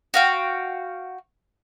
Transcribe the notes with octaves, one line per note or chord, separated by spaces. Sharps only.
F#4 F5 G5